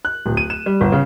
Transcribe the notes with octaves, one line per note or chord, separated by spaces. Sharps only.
F#6
D1
D#7
E7
G3
G1
C#3